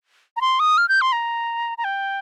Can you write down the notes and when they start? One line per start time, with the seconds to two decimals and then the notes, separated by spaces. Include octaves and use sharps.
0.37 A#5
0.41 C6
0.60 D#6
0.78 F6
0.89 G6
1.01 C6
1.12 A#5
1.78 A#5
1.84 G5